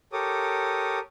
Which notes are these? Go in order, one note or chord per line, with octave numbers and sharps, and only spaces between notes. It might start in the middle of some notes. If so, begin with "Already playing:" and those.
G4 A4 A#4 C#5 D6 D#6